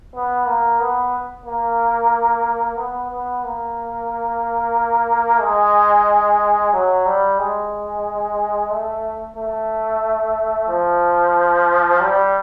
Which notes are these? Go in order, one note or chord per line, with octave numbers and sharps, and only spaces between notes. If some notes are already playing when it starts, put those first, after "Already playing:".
B3
A#3
B3
A#3
B3
B3
A#3
G#3
F#3
G3
G#3
A3
A3
F3
G3